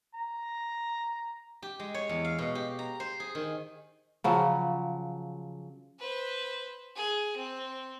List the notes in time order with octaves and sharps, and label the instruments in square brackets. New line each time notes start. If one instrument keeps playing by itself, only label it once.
[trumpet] A#5
[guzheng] G4
G#3
C#5
E2
F5
B2
G4
A#5
C5
G#4
D#3
[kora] C#3 F3 F#3
[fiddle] B4 C5
G#4
C4